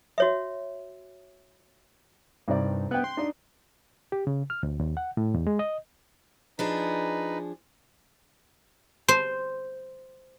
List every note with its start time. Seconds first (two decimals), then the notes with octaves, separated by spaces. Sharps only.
0.18 F#4 C#5 E5
2.48 C2 G2 D#4 D5
2.91 B3 G5 F#6
3.04 C6
3.17 D4 D#4
4.12 G4
4.27 C#3
4.50 F6
4.63 D2
4.80 D#2
4.97 F#5
5.17 A2
5.34 E2
5.47 G#3
5.59 D#5
6.59 F3 D4 D#4 G#4 B4
9.08 C5